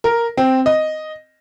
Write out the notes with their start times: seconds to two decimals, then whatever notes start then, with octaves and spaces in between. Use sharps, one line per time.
0.04 A#4
0.37 C4
0.66 D#5